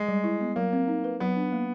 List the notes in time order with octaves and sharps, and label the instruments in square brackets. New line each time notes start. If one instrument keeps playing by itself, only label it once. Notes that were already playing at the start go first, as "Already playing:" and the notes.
Already playing: [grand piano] G#3
[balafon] G3
E4
B3
[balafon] F#3 [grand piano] A#3
[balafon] C4
D#4
B4
[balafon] F#3 [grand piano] B3
[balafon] D4
A#3